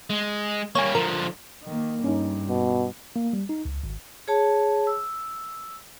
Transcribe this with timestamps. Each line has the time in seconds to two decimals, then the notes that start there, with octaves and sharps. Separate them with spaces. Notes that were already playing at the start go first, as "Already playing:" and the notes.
0.10 G#3
0.75 G3 A#3 C#5 G#5
0.95 D3 F3 A#4
1.64 D#3 A#3
2.04 G2 C#4 D#4
2.48 B2
3.16 A#3
3.33 G3
3.49 D#4
3.65 C#2
3.84 G#1
4.28 G#4 C#5 A5
4.87 E6